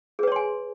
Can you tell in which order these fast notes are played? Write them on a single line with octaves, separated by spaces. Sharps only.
G#4 B4 C#5 C6 G#5